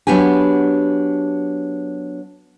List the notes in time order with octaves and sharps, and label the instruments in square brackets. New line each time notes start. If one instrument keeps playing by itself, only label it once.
[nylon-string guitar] F#3 B3 D4 G4 G#5